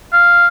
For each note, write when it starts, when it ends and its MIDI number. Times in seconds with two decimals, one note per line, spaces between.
0.13 0.47 77